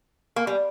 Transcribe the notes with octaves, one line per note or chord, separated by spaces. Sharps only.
A#3
G3